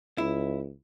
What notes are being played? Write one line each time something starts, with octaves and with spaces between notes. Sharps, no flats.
C#2 E4